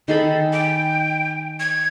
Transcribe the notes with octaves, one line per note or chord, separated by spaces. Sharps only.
D#3 G#4 A4 B5
G5
G#6